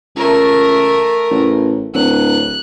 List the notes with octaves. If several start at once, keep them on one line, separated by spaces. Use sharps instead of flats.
C#2 A3 A#4
A1
D1 F#6